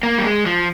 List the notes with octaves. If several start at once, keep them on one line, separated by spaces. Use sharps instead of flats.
A#3
G3
G#3
F3